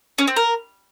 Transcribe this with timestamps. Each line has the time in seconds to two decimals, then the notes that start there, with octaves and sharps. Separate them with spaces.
0.18 C#4
0.27 C4
0.36 A#4